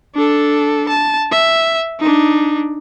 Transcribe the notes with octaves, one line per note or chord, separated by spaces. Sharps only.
D4 A4
A5
E5
D4 D#4